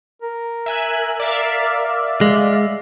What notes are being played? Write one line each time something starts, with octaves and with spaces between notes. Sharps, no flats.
A#4
E5 G#5 F#6
D5 E5 F5
G#3